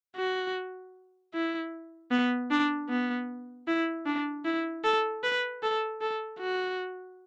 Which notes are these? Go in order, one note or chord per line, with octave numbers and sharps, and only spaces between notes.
F#4
E4
B3
D4
B3
E4
D4
E4
A4
B4
A4
A4
F#4